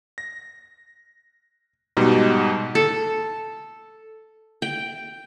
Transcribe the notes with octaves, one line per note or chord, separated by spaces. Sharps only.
A#6
G#2 B2 G3 D#4
A4
G5